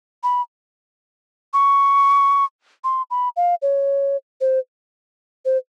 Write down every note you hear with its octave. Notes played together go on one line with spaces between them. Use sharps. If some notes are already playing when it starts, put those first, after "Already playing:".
B5
C#6
C6
B5
F5
C#5
C5
C5